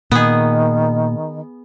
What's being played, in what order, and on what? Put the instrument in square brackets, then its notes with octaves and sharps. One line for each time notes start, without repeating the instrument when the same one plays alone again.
[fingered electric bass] A#2 [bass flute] D#3 [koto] B3 G#4